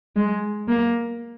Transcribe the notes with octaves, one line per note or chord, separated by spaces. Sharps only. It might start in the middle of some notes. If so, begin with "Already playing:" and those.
G#3
A#3